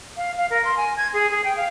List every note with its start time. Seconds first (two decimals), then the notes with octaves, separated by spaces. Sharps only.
0.17 F5
0.37 F5
0.50 A#4
0.64 C6
0.77 G#5
0.96 G#6
1.13 G#4
1.30 G#4
1.44 G5
1.56 F5